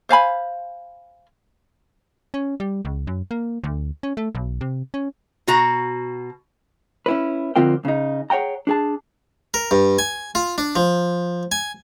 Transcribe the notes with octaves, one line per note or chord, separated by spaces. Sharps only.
C5 F5 G#5 B5
C#4
G3
C#2
F#2
A#3
D2
C#4
A3
B1
C3
C#4
B2 F#4 A#5
C#4 E4 B4
F2 D3 C4 F4 A#4 G5
C#3 D#4
G#4 C#5 F#5 G5 A#5
D4 G#4 A5
A#4
G2
G#5
F4
D4
F3
G#5